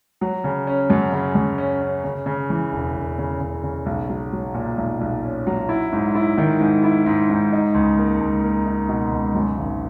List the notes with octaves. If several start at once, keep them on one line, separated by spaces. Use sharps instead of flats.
F#3
C#3
C#4
F#2
C#3
F#2
C#4
C#4
C#3
C#3
E3
E1
E1
C#3
C#3
C#3
B1
F#3
F#3
A#2
B1
B1
C#4
F#3
E4
G#2
E4
D#3
G#2
E4
G#2
G#2
D#4
C#2
A#3
C#2
A#3
D#4
B2
C#2
F#2
G#1